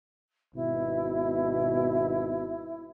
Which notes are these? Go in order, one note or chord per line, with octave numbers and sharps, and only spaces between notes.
G#1 B2 E4